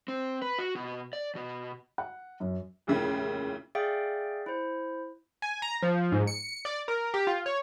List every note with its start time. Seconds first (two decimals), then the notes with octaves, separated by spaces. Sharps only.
0.08 C4
0.42 B4
0.59 F#4
0.75 B2
1.13 D5
1.35 B2
1.98 F#5
2.40 F#2
2.87 F1 D#2 A#2 C#3 E4
3.75 G#4 D5 E5 F5 G5
4.46 E4 C5
5.42 G#5
5.62 A#5
5.82 F3
6.12 G#2
6.27 C#7
6.65 D5
6.88 A#4
7.14 G4
7.27 F4
7.46 C#5